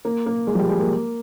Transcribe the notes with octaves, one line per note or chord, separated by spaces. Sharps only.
A#3
A#3
G#3
F3
G3
G#3
A#3